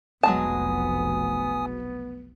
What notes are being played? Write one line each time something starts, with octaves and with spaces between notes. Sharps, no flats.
F1 B1 F#3 G#3 B3 G#5 A5 D#6